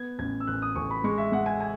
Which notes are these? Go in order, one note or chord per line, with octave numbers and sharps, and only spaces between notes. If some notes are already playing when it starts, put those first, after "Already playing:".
Already playing: B3 G#6
A1 G#6
E6
A1 F#6
D#6
A1 C#6
B5
G#3 C#6
E5
G#3 F#5
G#5
G#5